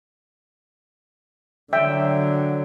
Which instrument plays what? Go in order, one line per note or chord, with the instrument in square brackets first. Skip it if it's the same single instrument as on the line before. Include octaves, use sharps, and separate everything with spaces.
[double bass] D3 F#3 [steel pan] E5 G5